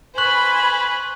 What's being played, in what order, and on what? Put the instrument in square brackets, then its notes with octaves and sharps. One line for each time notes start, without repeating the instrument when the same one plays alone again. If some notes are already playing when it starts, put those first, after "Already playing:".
[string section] B4 C5 [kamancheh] G#5 B5 [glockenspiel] C#6 F#6 F#7